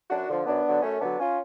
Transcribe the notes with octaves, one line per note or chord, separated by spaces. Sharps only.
F#2 D4 F#4
D3 F3
F#2 B3 D4
D3 F#3
F#2 A3 C#4
D3 F#3 B3 D4
C#4 F4